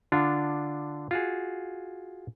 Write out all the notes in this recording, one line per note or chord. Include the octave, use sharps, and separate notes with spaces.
D3 D4 F4
F4 F#4 G#4